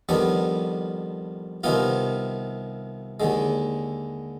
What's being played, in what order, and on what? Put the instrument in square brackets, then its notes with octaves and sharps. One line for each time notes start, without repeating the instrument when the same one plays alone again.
[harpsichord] F2 D#3 G3 B3 D4
C2 C3 D#3 B3 F4
D#2 D3 G#3